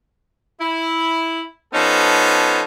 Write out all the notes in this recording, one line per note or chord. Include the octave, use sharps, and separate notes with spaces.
E4
F3 B3 C#4 D#4 A4